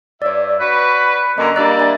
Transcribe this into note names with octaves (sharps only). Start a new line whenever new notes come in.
G2 C#5 D5 E5
F#4 B4
F#2 D3 A#3 D#5 A#5
G3 A#3 D4 D5 E6 F#6
E5 G#5 A6